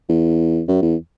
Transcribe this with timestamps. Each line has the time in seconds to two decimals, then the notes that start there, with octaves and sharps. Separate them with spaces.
0.09 E2
0.68 F#2
0.82 E2